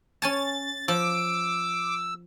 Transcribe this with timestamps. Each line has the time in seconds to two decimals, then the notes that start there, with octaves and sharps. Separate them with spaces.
0.22 C#4 G#5 A5 A6
0.88 F3 D6 E6